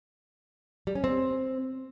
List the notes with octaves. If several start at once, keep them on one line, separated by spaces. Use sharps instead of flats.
G3
C#4
C4